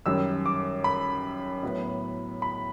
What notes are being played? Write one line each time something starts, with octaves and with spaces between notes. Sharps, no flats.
F#2 D#3 G3 E6
D6
B5
A2 F#3 B3
B5